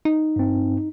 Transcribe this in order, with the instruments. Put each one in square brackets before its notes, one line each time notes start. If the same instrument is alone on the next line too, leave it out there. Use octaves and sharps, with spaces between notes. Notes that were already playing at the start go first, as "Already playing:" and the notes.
[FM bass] D#4
[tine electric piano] G2 C4